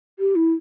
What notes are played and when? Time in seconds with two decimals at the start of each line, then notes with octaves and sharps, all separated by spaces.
0.19 G4
0.36 E4